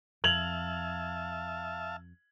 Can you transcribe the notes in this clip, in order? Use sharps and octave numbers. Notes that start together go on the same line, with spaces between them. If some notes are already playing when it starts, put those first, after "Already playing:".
F2 E5 F5 A5 G#6 F7 F#7